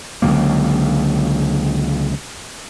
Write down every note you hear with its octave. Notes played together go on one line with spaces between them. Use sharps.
C#2 D3 F#3 A#3